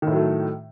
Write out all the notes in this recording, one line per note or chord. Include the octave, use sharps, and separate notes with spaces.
A2 D#3 F#3 A3